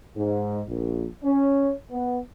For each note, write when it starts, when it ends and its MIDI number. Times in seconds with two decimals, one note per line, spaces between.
0.16 0.60 44
0.67 1.06 34
1.24 1.71 61
1.90 2.19 59